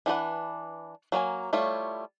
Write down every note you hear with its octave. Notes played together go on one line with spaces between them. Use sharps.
E3 D4 F#4 B4 F#5
F#3 A#3 A#4 G#5
G3 A3 E4 F4 C#5